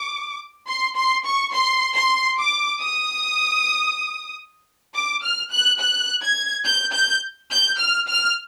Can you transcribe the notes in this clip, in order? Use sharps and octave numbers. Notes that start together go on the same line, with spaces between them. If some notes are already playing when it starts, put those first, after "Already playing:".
Already playing: D6
C6
C6
C#6
C6
C6
D6
D#6
D6
F6
F#6
F#6
G#6
G6
G6
G6
F6
F6